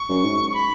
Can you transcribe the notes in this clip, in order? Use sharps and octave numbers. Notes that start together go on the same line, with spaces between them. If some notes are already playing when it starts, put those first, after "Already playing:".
Already playing: C#6
F#2
G#2
C#6
B5